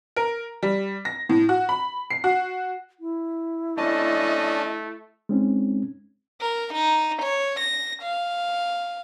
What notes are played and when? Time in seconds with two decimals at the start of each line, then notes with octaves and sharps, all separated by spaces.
0.16 A#4
0.63 G3
1.05 A#6
1.29 A2
1.49 F#4
1.69 B5
2.10 C7
2.24 F#4
3.00 E4
3.78 A3 C#4 D4 D#5 A5
5.29 G#3 C4 C#4 D#4
6.41 A#4
6.74 D#4
7.22 C#5
7.60 A#6
8.02 F5